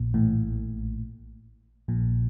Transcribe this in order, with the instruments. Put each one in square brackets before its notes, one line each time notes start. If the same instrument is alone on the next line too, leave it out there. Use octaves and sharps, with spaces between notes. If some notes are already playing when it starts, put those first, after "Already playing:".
Already playing: [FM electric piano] A#1 A#2
A1 A2
A#1 A#2